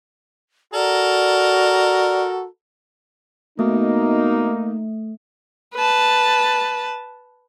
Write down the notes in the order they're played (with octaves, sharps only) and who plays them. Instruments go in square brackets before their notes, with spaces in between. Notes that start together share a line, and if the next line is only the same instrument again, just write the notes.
[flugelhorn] F#4 [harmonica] A4 A#4 A#5 [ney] D5
[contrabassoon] B2 [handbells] A3 [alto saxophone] A#3 [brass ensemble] D#4
[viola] B4 A5